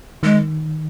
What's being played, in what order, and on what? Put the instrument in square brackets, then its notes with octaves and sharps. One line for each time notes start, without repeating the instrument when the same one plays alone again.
[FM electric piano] D#3 [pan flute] G#3